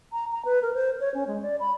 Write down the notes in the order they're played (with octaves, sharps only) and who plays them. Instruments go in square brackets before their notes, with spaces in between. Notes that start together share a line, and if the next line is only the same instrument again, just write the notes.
[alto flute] A#5
A#5
B4
A#4
C5
C#5
C#4
G#3
D5
B5